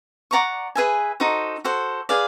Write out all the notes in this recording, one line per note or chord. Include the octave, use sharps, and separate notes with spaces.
D5 F#5 A#5 C#6
G#4 B4 E5 G#5
D#4 F#4 A4 C5
F#4 A4 C5
G#4 B4 D5 F5